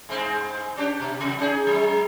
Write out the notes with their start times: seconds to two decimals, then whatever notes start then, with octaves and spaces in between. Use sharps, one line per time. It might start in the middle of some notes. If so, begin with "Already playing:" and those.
0.09 G2 G#3 C4
0.77 C#4 D4 G4
1.00 B2
1.20 C3 F#3
1.39 C#4 D#4 G#4
1.67 F#3 G#3